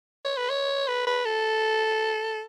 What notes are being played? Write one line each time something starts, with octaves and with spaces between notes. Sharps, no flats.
C#5
B4
C#5
B4
B4
A4